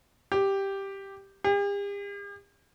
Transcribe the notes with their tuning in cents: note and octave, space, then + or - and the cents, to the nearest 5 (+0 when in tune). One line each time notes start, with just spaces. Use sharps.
G4 +0
G4 +45